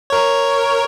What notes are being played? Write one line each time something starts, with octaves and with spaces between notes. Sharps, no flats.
A#4 C#5